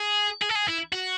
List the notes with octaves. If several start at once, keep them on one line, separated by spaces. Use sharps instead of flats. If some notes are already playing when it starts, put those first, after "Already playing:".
Already playing: G#4
G#4
A4
G#4
E4
F#4